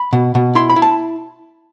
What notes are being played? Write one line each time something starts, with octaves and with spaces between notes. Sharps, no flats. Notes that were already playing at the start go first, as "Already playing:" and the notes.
Already playing: B5
B2
B2
E4 C6
B5
E4
A5